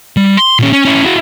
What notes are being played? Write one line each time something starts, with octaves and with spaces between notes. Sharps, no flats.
G3
C6
A#2 C#4
C#4
C#4 E4
E4 F#4